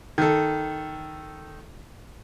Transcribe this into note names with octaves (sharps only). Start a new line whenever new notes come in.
D#3 A4